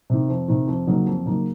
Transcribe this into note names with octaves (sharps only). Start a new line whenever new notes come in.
C3 D#3
F2
C3 D#3
F2
C#3 F#3 A#3 D#4
F2
C#3 F#3 A#3 D#4